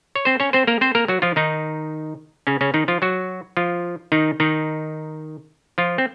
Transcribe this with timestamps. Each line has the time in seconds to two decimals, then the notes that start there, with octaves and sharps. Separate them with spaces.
0.16 C#5
0.25 C4 C5
0.40 C#4 C#5
0.53 C4 C5
0.67 A#3 A#4
0.81 C4 C5
0.95 A#3 A#4
1.08 F#3 F#4
1.22 F3 F4
1.36 D#3 D#4
2.47 C#3 C#4
2.61 C#3 C#4
2.74 D#3 D#4
2.88 F3 F4
3.02 F#3 F#4
3.57 F3 F4
4.12 D#3 D#4
4.40 D#3 D#4
5.78 F3 F4
5.98 C4